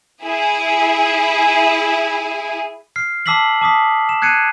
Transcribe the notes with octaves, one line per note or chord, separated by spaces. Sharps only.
E4 G#4
F6 C7
A5 D6 E6 B6 C7 F#7
A5 D6 D#6 B6
E7
F#6 G#6 C7 C#7 D#7